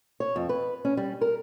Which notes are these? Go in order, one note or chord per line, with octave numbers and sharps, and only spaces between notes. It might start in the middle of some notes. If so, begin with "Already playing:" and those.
C#5
F2
B4
C#4
G3
A#4